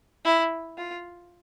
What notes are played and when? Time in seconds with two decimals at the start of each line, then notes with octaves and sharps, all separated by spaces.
0.25 E4
0.78 F4